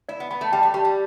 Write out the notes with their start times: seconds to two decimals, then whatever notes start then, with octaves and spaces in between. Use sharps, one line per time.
0.09 E4 D5
0.20 B3
0.31 B3 B5
0.41 A3
0.52 G3 G5
0.63 A3
0.74 G3 G4
0.85 G3